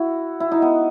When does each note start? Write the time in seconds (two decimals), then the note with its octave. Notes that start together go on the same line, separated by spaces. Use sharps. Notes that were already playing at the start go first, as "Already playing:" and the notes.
Already playing: E4 F#4
0.40 E4
0.52 D#4
0.62 B3